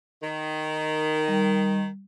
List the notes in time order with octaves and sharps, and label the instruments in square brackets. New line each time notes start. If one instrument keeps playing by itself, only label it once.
[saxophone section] D#3
[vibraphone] G3